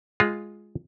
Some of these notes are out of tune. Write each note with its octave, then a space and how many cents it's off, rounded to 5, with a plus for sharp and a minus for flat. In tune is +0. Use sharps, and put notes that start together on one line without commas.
G#3 +0 F4 +0